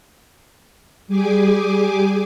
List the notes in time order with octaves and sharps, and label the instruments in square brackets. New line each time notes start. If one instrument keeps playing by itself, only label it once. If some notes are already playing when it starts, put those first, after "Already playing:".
[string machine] G3 G4 G#4 G#5 D6